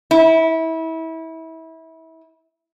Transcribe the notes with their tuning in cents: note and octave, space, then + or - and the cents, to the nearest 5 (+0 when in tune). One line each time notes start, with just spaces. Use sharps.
E4 -25